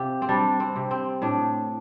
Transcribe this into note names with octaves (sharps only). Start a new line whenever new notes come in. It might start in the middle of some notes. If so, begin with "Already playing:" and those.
Already playing: C3 F4 G4
C4
G3 D4
C4
C3
C4
A2 D4